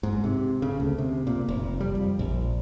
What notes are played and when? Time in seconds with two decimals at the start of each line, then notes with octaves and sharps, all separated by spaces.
0.03 G#2
0.24 C3
0.62 C#3
0.80 D2
0.98 C3
1.27 A#2
1.48 F1
1.80 G3
1.95 F2
2.19 A#1